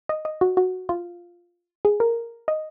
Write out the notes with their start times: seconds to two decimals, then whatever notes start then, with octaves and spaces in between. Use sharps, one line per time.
0.09 D#5
0.25 D#5
0.41 F#4
0.57 F#4
0.89 F4
1.85 G#4
2.00 A#4
2.48 D#5